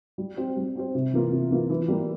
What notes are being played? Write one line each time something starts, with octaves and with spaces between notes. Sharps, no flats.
G3
C4 G4 C5
G3
C4 G4 C5
C3
E3 A#3 F4
C3
E3 A#3 F4
E3
G3 A#3